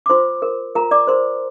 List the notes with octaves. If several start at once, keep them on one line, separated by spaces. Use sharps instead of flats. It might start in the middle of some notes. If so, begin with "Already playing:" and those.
D6
F4 C5 C6
A#4
F4 A#4 A#5
D5 D6
A#4 C5 C6